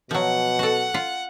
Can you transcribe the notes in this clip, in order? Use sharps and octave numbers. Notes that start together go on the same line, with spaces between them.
B2 F3 F#3 F#5
F#4 A4
F4